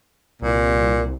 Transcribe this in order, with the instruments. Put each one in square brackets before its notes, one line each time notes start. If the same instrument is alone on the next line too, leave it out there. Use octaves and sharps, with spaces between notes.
[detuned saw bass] C2 [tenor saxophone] A#2